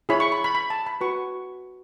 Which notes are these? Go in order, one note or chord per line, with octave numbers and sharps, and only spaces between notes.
E4 G#4 C#5 B5
C#6
B5
B5
B5
A5
B5
F#4 B4 C#6